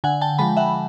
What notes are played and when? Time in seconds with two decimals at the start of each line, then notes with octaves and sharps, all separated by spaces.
0.04 D3 F#5 G#5
0.21 G5 A5
0.39 F3 G#3 A5 B5
0.57 E5 F#5